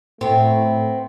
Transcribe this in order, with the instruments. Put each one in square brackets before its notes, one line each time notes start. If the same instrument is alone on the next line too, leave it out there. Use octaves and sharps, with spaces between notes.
[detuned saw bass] A2 [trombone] A3 [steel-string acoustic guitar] B3 C4